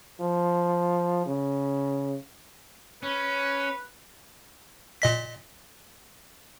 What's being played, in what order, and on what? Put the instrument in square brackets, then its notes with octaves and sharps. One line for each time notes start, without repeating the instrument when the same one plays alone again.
[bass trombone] F3
C#3
[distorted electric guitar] C#4 [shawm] B4
[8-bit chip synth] A#2 D#5 B6